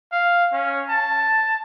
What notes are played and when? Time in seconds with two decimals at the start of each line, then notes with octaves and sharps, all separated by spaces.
0.12 F5
0.52 C#4
0.89 A5